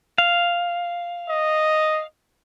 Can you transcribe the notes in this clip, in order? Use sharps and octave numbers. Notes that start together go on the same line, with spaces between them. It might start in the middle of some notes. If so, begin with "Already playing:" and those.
F5
D#5